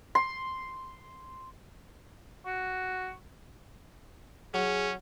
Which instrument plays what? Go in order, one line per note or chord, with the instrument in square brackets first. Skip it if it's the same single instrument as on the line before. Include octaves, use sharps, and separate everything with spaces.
[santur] C6
[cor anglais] F#4
[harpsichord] F#3 [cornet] C#4 [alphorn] G#4